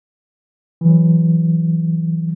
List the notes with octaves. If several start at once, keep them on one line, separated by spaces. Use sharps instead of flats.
E3 F#3